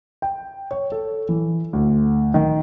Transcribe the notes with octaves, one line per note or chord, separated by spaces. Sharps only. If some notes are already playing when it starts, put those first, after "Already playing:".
G5
C#5
A4
E3
D2
D#3